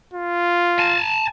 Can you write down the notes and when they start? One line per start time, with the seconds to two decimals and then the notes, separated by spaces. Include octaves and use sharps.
0.13 F4
0.79 G#5 A5